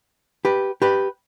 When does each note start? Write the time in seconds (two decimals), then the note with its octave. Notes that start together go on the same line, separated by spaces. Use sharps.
0.45 G4 B4
0.82 G4 B4